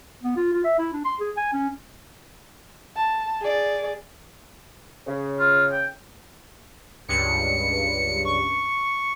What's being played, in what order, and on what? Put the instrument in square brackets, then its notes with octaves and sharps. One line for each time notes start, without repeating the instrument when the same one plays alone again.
[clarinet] B3
F4
F4
E5
E4
D4
C6
G#4
G#5
C#4
[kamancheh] A5
G#4 D5
[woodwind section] C#3
[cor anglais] F4
G5
[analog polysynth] C#2 G2 [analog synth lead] C#7
[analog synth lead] C#6